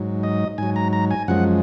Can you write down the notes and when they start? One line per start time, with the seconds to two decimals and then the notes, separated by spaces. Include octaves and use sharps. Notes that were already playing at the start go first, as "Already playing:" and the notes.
Already playing: G#2 F#3
0.23 D#5
0.58 G#2 F#3 G#5
0.76 A#5
0.93 A#5
1.11 G#5
1.28 F#2 F3 G#3 F#5